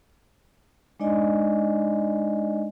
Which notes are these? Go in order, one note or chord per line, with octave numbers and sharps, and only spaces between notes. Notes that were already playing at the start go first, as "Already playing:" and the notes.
G#3 D4 D#4 D5 D#5 G#5